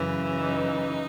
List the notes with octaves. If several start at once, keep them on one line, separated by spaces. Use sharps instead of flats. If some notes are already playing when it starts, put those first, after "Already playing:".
Already playing: F#2 C#3 E3
D#4